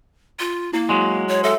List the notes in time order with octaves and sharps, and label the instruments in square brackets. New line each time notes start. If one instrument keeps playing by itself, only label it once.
[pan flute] F4
[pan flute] A#3 [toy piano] E4
[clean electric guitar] F#3 G#3
[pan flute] C#5
[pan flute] A4 [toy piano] C#5 E5